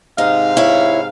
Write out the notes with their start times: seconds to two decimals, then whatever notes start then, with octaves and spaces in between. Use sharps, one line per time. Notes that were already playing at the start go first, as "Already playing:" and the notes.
0.18 G#2 C3 D#4 F5
0.57 E4 C#5